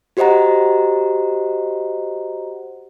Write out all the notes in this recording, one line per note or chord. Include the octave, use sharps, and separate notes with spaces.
F#4 G4 C5 D#5 F#5 A#5